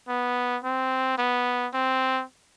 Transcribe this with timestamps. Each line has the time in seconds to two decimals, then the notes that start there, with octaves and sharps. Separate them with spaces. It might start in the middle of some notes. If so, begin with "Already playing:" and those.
0.09 B3
0.64 C4
1.18 B3
1.74 C4